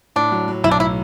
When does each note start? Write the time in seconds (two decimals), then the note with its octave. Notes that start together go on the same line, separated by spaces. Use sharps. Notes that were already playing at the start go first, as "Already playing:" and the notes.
0.16 A2 D4
0.32 F#3
0.48 F#3
0.64 B1 E4
0.71 D4
0.80 A2 E4